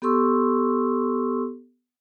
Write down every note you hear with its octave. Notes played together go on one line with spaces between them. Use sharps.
B3 G4 A4 C6 C#6 E6